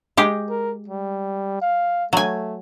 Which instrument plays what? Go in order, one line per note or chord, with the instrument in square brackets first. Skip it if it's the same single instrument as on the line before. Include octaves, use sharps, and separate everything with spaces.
[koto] G#3 G4
[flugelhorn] A#4
G3
F5
[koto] F#3 G#5 [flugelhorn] A3